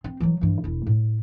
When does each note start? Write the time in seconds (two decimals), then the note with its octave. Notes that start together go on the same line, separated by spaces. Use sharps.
0.04 C4
0.20 E3 F#3
0.41 G2 E3
0.64 E1 E4
0.86 A2